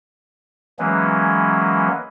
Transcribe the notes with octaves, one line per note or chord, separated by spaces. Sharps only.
E3 F#3 G#3 A#3 B3 C#4